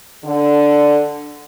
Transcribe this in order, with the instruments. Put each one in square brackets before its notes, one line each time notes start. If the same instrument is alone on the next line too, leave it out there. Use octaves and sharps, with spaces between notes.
[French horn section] D3